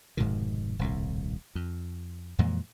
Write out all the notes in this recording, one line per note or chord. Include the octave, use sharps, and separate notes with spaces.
F1 G#2 B2 D#3
D#1 C2 A2
F2
F2 A#2 E3 G#3